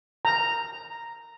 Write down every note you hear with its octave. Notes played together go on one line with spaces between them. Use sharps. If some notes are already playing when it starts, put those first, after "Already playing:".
A#5